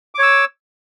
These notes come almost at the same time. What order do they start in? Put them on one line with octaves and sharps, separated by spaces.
D6 C#5 E6